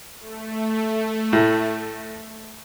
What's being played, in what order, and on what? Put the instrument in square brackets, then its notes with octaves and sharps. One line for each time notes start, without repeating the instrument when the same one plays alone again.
[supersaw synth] A3
[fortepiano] A2